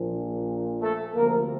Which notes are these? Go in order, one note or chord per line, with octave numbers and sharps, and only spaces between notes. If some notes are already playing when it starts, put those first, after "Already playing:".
Already playing: A#1 A#2 F3
A3 A4
D2 C3 F3 A#3 A#4